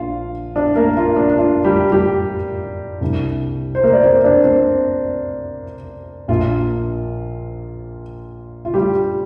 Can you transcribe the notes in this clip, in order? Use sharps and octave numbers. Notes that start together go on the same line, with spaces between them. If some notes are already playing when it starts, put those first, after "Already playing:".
Already playing: A#1 A#2 F3 D4 F4 F5
D4 D5
A#3 A#4
F4
D4
D4
F4
G3 G4
G3 G4
C2 C3 G3 D4
C5
A#3 A#4
D5
C4 C5
D4 D5
C4 C5
A#1 A#2 A#3 D4 F4
F4
G3 G4